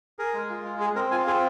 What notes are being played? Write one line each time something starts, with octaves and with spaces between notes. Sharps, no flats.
G#4 A#4
G#3
F4
G#3
G#4
C4 A#4
F4 G#5
C4 G#4